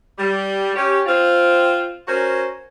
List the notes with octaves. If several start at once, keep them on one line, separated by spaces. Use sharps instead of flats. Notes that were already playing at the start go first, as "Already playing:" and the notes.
G3
C#4 G4
C4 F4
C#4 F#4 A#4 C5